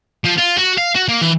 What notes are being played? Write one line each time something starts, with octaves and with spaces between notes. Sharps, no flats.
F3
F4
F#4
F5
F#4
A#3
E3